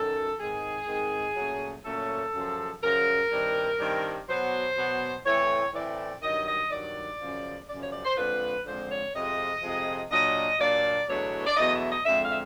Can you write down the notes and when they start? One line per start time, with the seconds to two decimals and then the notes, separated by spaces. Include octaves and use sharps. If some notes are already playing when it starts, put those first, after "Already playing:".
Already playing: F#2 D#3 F#3 A4
0.38 G#2 D#3 G#3 C4 G#4
0.87 G#2 D#3 G#3 C4
1.35 A#2 F#3 A3 C#4
1.84 A#2 F#3 A3 C#4 A4
2.32 F#2 C#3 F3
2.81 F#2 C#3 F3 A#4
3.30 G2 D#3 G3 C4
3.79 G2 D#3 G3 C4
4.28 B2 F#3 B3 C5
4.76 B2 F#3 B3
5.24 A2 E3 A3 C4 C#5
5.73 A2 E3 A3 C4 D5
6.22 G2 D#3 F#3 D#5
6.46 D#5
6.70 G2 D#3 F#3 D5
7.19 F#2 C#3 F3
7.68 F#2 C#3 F3 D5
7.80 C#5
7.91 D5
8.04 C5
8.16 F2 D3 F3 G#3 B4
8.65 F2 D3 F3 G#3 C5
8.90 C#5
9.14 F2 C3 F3 G#3 D#5
9.62 F2 C3 F3 G#3
10.10 A#2 F#3 A#3 D4 D#5
10.59 A#2 F#3 A#3 D4 D5
11.08 E2 B2 F#3 A3 D4 C#5
11.47 D5
11.56 E2 B2 F#3 A3 D4 D#5
11.73 E5
11.89 D#5
12.05 F2 D3 F3 G#3 E5
12.21 F5
12.30 E5